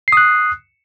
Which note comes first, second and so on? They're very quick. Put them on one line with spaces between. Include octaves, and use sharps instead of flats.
C7 D#6 F#6